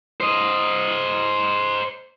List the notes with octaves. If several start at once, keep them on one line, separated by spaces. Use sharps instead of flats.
C5 D#5